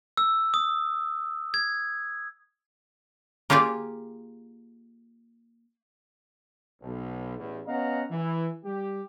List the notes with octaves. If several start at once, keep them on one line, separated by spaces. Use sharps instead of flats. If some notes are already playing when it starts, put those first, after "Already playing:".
E6
D#6
G#6
A#3 F4 G4 G#4 D5
B1
A1 E2
B3 C#4 D#5 F5 F#5 A#5
E3
G3 G4